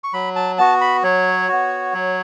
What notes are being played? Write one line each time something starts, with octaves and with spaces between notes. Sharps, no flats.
C#6
F#3 B5
A5
B3 F#4 A5
B5
F#3 C#5
B3 F#4
F#3